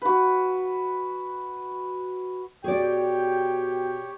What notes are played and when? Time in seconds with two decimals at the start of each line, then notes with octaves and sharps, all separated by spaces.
0.02 F#4 B4
2.64 B2 G4 G#4 C#5 D5 G5